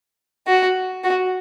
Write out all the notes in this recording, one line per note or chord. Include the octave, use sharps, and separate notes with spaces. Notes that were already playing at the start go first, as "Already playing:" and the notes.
F#4
F#4